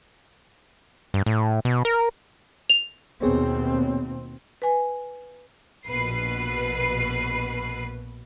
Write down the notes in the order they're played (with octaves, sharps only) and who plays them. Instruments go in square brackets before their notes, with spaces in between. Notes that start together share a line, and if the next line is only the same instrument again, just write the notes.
[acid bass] G2
A2
B2
A#4
[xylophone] F7
[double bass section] D#2 B2 C4 [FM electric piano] B3 G#4 C#5
[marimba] B4 G#5
[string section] A#1 B2 B4 C7